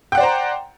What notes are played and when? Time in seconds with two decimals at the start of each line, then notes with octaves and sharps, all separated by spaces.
0.12 G5
0.15 F#5
0.18 D5
0.20 C5
0.23 A#5